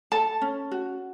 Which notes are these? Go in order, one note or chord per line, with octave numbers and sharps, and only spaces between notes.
A4 A5
C#4
F#4